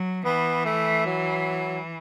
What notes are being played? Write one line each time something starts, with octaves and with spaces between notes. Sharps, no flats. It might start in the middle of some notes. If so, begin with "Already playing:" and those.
Already playing: F#3
E3 B3
A3
F#3